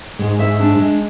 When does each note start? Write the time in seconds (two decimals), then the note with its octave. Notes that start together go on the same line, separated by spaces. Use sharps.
0.19 G#2 G#3
0.39 E5
0.60 D4
0.80 G#3